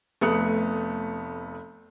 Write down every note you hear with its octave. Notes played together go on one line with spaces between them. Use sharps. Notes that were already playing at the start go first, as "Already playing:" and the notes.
F1 A3 B3 D#6 F#6 C#7